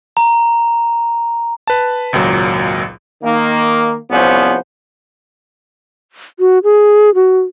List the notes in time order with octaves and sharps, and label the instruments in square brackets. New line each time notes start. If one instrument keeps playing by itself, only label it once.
[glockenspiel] A#5
[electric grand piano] B4 A5
G#1 C#2 A#2 F#3
[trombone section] D#3 A#3
C2 F3 B3 C#4 C5
[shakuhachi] F#4
G#4
F#4